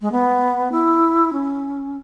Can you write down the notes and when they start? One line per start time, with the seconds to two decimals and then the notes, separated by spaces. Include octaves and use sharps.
0.02 G#3
0.12 B3
0.72 E4
1.33 C#4